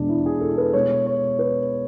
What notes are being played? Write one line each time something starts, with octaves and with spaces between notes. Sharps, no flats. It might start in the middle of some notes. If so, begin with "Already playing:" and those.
Already playing: E2 B2 G#3 D4
E4
G#4
A4
B4
B2 G#3 C#5
C#5
B4